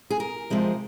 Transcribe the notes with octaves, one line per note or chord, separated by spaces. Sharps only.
G#4
A#4
C3 F3 G#3 C4